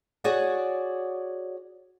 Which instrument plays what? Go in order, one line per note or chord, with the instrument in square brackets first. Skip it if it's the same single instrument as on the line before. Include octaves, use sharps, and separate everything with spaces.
[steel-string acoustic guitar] F#4 G#4 C#5 D5 F#5